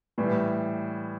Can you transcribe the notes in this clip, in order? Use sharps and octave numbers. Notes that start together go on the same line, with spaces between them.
A2 E3 G3 B3